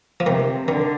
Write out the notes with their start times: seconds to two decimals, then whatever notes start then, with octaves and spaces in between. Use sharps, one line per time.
0.20 F3
0.25 C3 D#3
0.67 D3 D#3